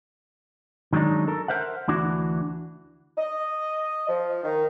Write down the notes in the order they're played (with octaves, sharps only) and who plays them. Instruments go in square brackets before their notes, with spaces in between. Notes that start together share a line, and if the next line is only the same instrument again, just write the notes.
[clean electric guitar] D#3 F#3 G#3 D4 D#4
A4 A#4
A#4 C5 E5 F#5
D2 E3 D4 F#4
[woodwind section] D#5
F3
D#3